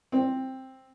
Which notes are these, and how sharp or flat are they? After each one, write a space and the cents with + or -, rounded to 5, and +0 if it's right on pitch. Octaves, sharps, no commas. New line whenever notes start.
C4 +5